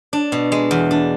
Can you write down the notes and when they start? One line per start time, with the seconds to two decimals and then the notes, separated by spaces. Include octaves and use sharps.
0.13 D4
0.32 B2
0.52 G#3
0.71 E2
0.91 D4